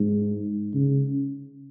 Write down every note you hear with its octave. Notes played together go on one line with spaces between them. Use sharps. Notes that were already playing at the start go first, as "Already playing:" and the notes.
Already playing: G#2
C#3